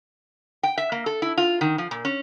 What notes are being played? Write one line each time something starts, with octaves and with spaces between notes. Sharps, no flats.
G5
E5
A#3
A4
E4
F4
D#3
F3
A#2
C#4